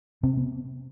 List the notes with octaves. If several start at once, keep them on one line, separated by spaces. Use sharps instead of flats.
C3 C4
B3